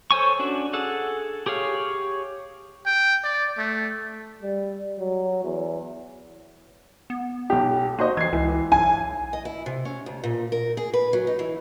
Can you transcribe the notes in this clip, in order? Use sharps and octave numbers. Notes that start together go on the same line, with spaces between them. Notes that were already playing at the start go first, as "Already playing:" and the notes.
A4 C5 C#5 G#5 C#6
C#4 D4 F#4
G#4 A4 F#5
G4 G#4 C#5 F5
G5
D5
A3
G3
F#3
E2
B3
B1 G4
A#3 F#4 C5 D#5
E3 G#6 C7
C#2 E3
B1 G#5
D#5
E4
C3
C#4
D2
A#2
A#4
G#4
B4
F#3
D#4
E3